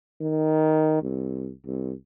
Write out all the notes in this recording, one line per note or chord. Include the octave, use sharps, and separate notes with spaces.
D#3
C2
C2